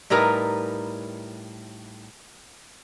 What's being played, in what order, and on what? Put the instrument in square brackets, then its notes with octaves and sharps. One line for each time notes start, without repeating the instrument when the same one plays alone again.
[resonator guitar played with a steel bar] A2 G3 D#4 A#4 B4 A#5